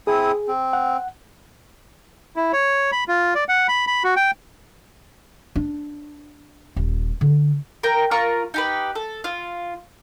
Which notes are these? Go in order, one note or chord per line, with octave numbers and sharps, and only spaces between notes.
C4 E4 G#4 D#6
C4
F#5
E4
C#5
B5
F4
D5
F#5
B5
B5
F#4
G5
D4
D#1
D3
A#4 G5
F4 A#4 C#6
D#4 G4 B4
A4
F4